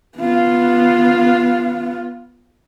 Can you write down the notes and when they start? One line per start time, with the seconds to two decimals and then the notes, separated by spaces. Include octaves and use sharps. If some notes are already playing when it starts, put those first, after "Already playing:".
0.17 B3 F4